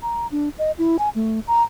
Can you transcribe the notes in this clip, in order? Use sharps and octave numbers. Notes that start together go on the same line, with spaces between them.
A#5
D4
D#5
E4
G#5
A3
A#5